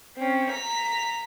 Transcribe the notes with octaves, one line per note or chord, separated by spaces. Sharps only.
C4 C#4
A#5 B6